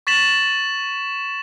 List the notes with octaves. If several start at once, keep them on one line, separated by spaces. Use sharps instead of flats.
C#6 A6 B6 E7 F#7